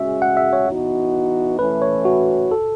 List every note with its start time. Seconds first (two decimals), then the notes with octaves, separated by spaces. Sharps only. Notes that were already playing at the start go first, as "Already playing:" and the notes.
Already playing: C#3 G#3 C#4 F#4 E5
0.22 F#5
0.37 E5
0.53 C#5
0.67 E3 B3 D#4 F#4
1.59 E3 A3 C#4 B4
1.82 C#5
2.05 F#4
2.51 A4